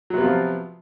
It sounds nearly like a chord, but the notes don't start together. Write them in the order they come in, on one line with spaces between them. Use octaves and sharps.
F#3 C3 B3 F4 F3